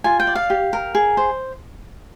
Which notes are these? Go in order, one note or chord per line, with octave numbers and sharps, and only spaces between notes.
F4 G#5
G5
D5
F5
G4
A#4
G#4
C5